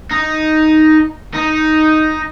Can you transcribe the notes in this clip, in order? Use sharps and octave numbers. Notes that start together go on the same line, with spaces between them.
D#4
D#4